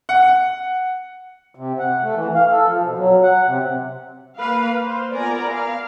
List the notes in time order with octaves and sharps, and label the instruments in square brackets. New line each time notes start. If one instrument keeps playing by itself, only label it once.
[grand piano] F#5
[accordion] C3
F#5
A3
E3
F5
A4
F3
B2
F#3
F#5
C3
[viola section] A#3 B4 F5
C5
B3 F4 A#4 D5 G#5 A#5
F5